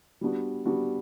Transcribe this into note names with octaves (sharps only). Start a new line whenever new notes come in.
G3 B3 D4 F#4
G3 B3 D4 F#4